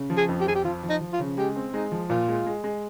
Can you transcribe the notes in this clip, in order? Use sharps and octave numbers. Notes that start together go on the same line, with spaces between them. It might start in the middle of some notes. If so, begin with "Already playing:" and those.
Already playing: C#3
F3
G#4
F2
G4
F2 G#4
G4
F3 F4
F3
D#4
F3
F4
C#3
G#3 G4
C4
G#3 D#4
F3
A#2 F4
G#3
G#3
G#3